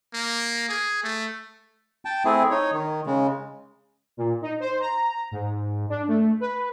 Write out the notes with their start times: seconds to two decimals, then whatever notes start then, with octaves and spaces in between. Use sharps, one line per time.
0.14 A#3
0.69 G#4
1.04 A3
2.05 G5 A5
2.25 A3 C4 E4 G#4
2.51 D#4 C#5
2.73 D#3
3.06 C#3 G#3
4.17 A#2
4.42 D#4
4.60 C5
4.80 A#5
5.31 G#2
5.89 D4
6.08 A3
6.40 B4